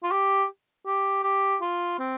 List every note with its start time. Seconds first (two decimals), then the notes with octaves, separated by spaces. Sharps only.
0.03 F4
0.11 G4
0.86 G4
1.23 G4
1.62 F4
1.99 C4